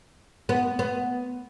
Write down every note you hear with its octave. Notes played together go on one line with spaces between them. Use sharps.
B3
B3